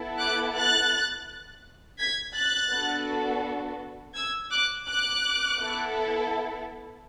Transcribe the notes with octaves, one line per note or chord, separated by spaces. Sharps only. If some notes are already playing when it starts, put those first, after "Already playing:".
Already playing: B3 E4 A4
D6 F#6
F#6 A6
G#6 B6
F#6 A6
B3 D4 F#4 A4
E6 G#6
D6 F#6
D6 F#6
B3 E4 A4